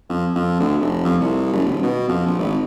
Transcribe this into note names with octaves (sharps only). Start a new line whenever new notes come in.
F2
F2
D2
F1
F2
C2
F#1
D#1
B2
F2
A#1
G#1